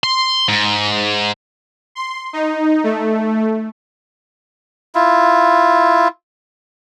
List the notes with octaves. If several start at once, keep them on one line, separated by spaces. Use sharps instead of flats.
C6
G#2
C6
D#4
A3
E4 F4